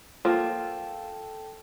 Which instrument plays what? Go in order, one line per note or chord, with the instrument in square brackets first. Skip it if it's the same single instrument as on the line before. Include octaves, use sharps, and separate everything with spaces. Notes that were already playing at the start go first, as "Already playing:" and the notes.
[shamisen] F3 A#3 [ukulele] F4 [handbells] A4 G5 A5